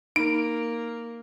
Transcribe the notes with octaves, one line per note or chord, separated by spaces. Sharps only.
A#3 D#4 D7